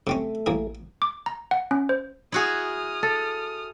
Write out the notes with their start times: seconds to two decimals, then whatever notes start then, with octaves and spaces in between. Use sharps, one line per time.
0.07 C3 A3 C4 C#4
0.46 A1 A#3 G#4
1.02 D6
1.26 A#5
1.51 F#5
1.71 C#4
1.89 C5
2.32 E4 F#4 G#4 D#6 F6
3.03 A4